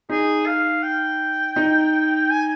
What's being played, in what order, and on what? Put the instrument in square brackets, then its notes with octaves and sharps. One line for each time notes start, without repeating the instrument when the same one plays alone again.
[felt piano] D#4 [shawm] G#4
[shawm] F5
G5
[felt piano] D#4
[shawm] G#5